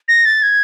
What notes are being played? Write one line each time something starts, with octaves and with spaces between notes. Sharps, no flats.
A#6
A6
G#6